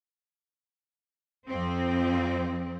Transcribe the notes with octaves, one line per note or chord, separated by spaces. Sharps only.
F2 C4